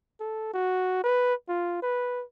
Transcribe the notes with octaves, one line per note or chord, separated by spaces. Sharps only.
A4
F#4
B4
F4
B4